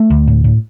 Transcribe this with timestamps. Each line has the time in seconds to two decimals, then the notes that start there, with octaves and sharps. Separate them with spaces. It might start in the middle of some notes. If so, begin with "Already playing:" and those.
Already playing: A3
0.10 D2
0.27 A2
0.44 A2